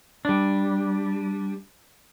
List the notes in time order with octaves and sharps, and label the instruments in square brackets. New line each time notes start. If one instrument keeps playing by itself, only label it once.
[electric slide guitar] G3 D4